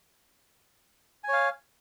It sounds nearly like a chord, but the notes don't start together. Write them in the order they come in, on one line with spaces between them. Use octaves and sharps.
G#5 C#5 F5